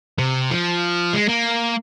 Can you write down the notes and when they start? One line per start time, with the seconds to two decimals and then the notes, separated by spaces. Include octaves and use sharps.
0.18 C3
0.51 F3
1.14 G#3
1.29 A#3